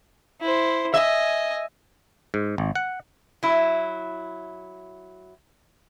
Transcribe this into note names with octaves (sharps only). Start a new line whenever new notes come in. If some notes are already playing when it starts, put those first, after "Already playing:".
E4 C5
D#5 E5 G#5
G#2
G#1
F#5
F#3 E4